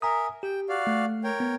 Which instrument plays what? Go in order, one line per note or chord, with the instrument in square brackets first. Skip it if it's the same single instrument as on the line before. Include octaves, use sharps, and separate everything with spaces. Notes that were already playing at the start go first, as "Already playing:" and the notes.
[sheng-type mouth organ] A#4 E5 [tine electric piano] G#5 A#5 D#6
[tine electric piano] G4 [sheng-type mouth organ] G5
[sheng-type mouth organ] F#4 D5 F5
[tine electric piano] A3
[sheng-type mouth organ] A#4 C#5 G5
[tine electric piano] B3